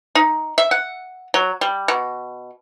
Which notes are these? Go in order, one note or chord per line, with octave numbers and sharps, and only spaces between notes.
D#4
E5
F#5
F#3
G3
B2